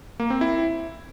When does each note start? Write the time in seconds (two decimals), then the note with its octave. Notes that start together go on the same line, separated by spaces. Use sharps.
0.20 A#3
0.30 C4
0.41 E4